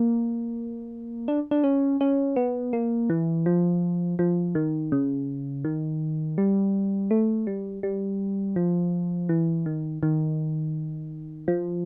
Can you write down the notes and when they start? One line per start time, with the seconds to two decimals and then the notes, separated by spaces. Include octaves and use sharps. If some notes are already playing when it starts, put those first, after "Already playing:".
Already playing: A#3
1.28 D4
1.51 D4
1.64 C#4
2.01 C#4
2.36 B3
2.73 A#3
3.10 E3
3.46 F3
4.19 F3
4.55 D#3
4.92 C#3
5.65 D#3
6.38 G3
7.11 A3
7.47 G3
7.83 G3
8.56 F3
9.29 E3
9.66 D#3
10.03 D#3
11.48 F3